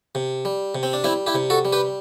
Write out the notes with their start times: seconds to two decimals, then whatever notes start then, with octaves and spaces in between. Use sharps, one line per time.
0.15 C3
0.45 G3
0.75 C3
0.83 C4
0.93 D4
1.04 G3 C4 E4
1.26 E4 G4
1.35 C3
1.50 F#4 A4
1.65 G3
1.72 G4 B4